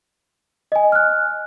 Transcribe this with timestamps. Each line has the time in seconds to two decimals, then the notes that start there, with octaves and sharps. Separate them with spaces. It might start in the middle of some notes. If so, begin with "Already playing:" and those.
0.72 D#5 G#5
0.92 F6 F#6